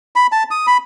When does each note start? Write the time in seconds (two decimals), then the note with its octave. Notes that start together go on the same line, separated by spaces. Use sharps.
0.16 B5
0.32 A5
0.51 D#6
0.67 B5